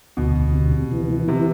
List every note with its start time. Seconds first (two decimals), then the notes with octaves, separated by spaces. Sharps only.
0.17 D2 B2
0.36 D2
0.54 C3
0.72 C3
0.92 E3
1.10 E3
1.28 C3 E3